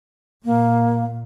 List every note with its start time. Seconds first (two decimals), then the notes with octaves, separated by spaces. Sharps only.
0.45 A#2 A#3